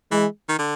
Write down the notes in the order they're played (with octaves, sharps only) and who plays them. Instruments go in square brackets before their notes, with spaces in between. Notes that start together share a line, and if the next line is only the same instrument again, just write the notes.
[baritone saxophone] E3 [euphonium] G#3
[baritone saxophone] D#3
D3